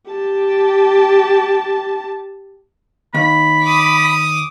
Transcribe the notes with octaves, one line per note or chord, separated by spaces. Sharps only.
G4 A5
D#2 B5
D6 D#6